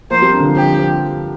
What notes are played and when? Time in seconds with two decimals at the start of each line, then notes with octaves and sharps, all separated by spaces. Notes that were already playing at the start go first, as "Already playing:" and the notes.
0.11 F3 A#3 C5
0.22 G3 C4
0.33 A#3 D4
0.40 D3
0.45 F3
0.56 F3 G4
0.79 F3